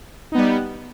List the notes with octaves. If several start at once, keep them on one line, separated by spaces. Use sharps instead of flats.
G3 B3 D#4